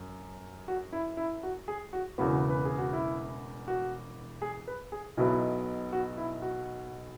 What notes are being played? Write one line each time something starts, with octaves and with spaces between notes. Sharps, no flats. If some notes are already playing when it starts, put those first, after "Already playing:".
Already playing: F#2
F#4
E4
E4
F#4
G#4
F#4
E1 E2 C#3 E3 B3 F#4
B4
G#4
F#4
E4
F#4
G#4
B4
G#4
B1 B2 F#3 B3 E4
F#4
E4
F#4